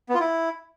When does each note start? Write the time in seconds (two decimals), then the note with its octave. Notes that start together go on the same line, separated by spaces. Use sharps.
0.09 B3
0.15 F4
0.20 E4